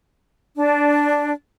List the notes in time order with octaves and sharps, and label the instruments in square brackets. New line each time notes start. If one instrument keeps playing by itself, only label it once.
[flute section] D4